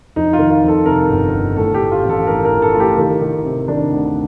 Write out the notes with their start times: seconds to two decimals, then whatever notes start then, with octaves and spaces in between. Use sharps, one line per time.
0.16 F2 D#4
0.33 F4
0.39 D#3
0.50 F4
0.63 F2
0.68 A4
0.86 C3 A#4
1.09 G1
1.34 G1
1.56 A2 A4
1.74 G4
1.80 A2
1.92 F4
2.03 A1
2.09 A4
2.26 A2 A#4
2.45 A#4
2.51 A1
2.62 A4
2.73 A2 F4
2.80 G4
2.97 D#3
3.21 D#3
3.45 C3
3.68 D#3 D4
3.92 D2